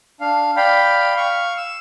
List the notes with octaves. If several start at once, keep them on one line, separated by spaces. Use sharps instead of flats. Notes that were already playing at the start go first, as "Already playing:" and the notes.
D4 F5
D5 F5 G5 B5
F5 C#6
E6